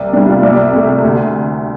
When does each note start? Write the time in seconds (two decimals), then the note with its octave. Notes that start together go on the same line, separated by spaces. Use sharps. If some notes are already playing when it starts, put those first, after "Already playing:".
Already playing: C2 D5
0.13 C3 G3 D4
0.28 F4
0.43 C2 D5
0.73 C3 A3
1.04 D2